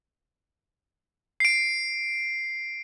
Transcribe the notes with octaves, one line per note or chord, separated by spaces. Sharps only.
C7 D7